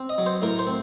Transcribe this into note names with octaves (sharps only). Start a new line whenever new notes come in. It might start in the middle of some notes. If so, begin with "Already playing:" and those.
Already playing: C4
D#5
F#3
C5
A2 A#4
C5
C4